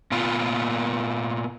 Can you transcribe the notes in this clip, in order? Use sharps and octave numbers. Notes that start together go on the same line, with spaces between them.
A#2 B3 F4